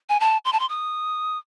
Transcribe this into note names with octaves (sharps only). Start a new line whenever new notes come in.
G#5
A5
C6
A5
C6
D#6